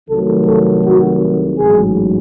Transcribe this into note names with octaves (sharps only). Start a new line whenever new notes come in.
C2 C3 D#3 F#3 A3 A4
A4
F#4
A1 G#2 F#3 G#4